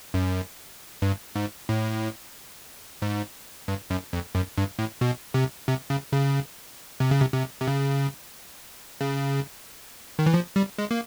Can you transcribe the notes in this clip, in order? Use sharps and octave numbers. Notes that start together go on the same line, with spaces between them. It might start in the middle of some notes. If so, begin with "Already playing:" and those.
F#2
G2
G#2
A2
G#2
G2
F#2
F2
F#2
G2
A2
B2
C3
C3
C#3
C#3
C3
C#3
C3
C3
C3
C#3
C#3
D#3
E3
F3
G3
G#3
A#3